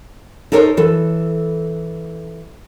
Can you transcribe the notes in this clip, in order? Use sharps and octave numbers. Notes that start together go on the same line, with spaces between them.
D#4 A4 A#4 C5 C#5
E3 A4